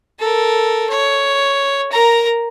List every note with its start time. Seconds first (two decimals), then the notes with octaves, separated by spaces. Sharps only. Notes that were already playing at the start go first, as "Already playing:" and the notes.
0.19 A4 A#4
0.89 C#5
1.92 A#4 A#5